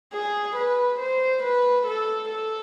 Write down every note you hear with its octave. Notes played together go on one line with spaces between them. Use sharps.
G#4
B4
C5
B4
A4
A4